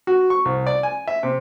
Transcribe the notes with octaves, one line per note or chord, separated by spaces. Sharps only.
F#4
C#6
C2
D5
G#5
E5
C3